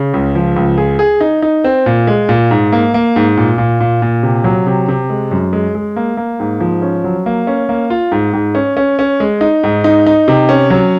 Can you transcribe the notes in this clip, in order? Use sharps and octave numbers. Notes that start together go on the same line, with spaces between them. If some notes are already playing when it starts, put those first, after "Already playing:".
Already playing: C#3
C#2
F3
C#2
G#4
G#4
D#4
D#4
C4
A#2
G#3
A#2
G#2
A#3
A#3
G#2
A#2
A#2
A#2
A#2
C3
F#3
C3
C3
G#3
F#2
G#3
G#3
A#3
A#3
G#2
F3
C#4
F#3
A#3
C#4
A#3
F4
G#2
G#2
C#4
C#4
C#4
G#3
D#4
G#2
D#4
D#4
C3
C#4
F#3